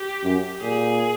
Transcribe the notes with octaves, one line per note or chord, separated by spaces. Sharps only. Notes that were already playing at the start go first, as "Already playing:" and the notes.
Already playing: G4
F#2
A#2 G#4